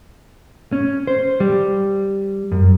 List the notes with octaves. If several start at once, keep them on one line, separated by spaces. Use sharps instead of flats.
C#4
C5
G3
F#2